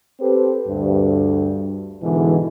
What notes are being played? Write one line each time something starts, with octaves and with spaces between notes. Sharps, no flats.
C4 G4 A4 B4 C5
D2 G2
G#2 B2 D3 E3